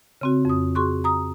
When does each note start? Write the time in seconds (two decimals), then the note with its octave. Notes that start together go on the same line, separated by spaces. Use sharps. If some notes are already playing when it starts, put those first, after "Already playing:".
0.21 C#3 C4 F#4
0.45 F2 D#6
0.75 F#4 G#4 C6 C#6 F#6
1.04 A#5 D#6